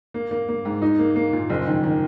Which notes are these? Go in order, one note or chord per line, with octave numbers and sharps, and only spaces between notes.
A#3
A#3
A#3
G#2
D#4
A#3
A#3
A#2
F#1
D#3
D#3